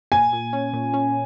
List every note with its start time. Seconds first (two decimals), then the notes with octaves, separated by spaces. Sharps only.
0.12 A#2 G#5
0.33 A#2
0.53 C#4
0.73 A#2
0.94 C#4